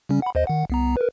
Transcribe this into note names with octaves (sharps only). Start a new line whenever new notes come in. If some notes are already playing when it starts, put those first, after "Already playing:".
C#3 G3 C#4
F#5 B5
D#2 C5 D#5
D#3 F#5
C2 B3 A#5
A#4 B4